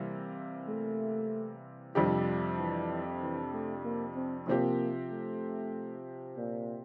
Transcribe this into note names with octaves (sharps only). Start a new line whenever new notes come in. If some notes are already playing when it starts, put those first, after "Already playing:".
Already playing: C3 E3 G3 A#3
A3
F2 C3 F3 G3 D4 G4
E3
E3
A3
A#3
C4
C3 F3 A#3 C4 G4
A3
A#2